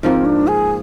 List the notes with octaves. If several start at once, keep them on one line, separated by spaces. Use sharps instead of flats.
G#2 F3 A#3 C4
D4
G#4